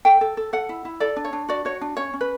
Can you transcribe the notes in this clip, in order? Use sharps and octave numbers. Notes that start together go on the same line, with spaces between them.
A4 G5
A4
A4
A4 F#5
E4
E4
A4 D5
D4
C#5
D4
F#4 D5
F#4 C#5
D4
C#4 C#5
C#4
B4